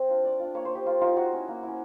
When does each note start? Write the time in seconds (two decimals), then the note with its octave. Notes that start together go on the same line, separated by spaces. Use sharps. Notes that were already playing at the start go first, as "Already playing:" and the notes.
Already playing: C4
0.09 D4 F4
0.23 A3 D5
0.39 D4 F4
0.54 A#3 C#5
0.65 C5
0.71 D#4 G4
0.86 A#3 F4
1.01 D#4 F4
1.17 A#3 F#4
1.33 C#4 E4
1.48 A#3
1.63 C#4 E4